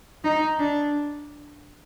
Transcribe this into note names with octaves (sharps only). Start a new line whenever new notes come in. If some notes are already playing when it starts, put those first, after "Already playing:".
D#4
D4